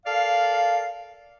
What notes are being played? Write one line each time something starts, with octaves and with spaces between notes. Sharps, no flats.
A4 A#4 D5 F5